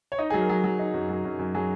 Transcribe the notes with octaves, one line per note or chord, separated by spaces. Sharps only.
C#5
D#4 D#5
F#3 G#4
A#4
F#3
F#3
D#4
F#2
F#3
F#2
F#2
F#3 G#4